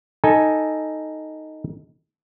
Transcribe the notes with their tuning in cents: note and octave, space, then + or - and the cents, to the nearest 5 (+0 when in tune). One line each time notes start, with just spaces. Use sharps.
D#4 +0 A4 +5 G#5 +0